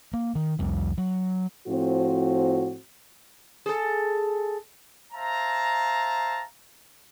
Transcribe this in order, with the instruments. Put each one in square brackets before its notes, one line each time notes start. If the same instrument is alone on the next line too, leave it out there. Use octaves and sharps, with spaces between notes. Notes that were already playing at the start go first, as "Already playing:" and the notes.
[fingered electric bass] A#3
D#3
C2 F2 G3
F#3
[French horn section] A2 F3 C4 F#4
[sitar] G#4 A4
[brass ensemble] C5 E5 F5 A5 A#5